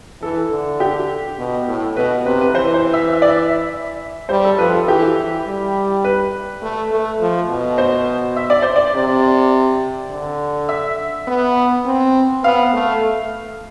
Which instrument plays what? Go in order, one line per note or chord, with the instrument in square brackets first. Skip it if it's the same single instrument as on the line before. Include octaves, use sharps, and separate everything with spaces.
[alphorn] E3 [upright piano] A4
[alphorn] D3
[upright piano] G4
[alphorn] B2
A2
[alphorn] B2 [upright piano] B4
[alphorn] C3 [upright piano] B4
[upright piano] B4
[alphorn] E3 [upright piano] C5
[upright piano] C5
E5
E5
D5
E5
[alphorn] G3 [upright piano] C5
[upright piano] A4
[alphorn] F3 [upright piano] B4
[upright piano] A4
[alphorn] E3 [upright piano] G4
[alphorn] E3
G3
[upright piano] B4
[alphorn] A3
A3
F3
B2
[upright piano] C5
E5
D5
C5
D5
[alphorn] C3
D3
[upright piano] E5
[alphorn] B3
C4
[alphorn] B3 [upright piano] F5
[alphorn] A3